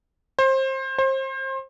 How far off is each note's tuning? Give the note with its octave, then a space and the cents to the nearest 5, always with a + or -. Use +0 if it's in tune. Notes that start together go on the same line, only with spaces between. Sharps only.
C5 +25
C5 +30